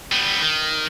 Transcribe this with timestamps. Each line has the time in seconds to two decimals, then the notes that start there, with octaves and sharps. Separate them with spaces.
0.12 G3 B3
0.41 D#3